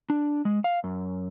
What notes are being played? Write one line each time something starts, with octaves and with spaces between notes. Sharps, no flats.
D4
G#3
F5
F#2